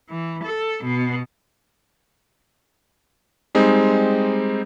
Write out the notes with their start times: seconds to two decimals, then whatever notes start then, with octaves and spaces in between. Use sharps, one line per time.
0.11 E3
0.44 A4
0.84 B2
3.55 G3 G#3 C4 D#4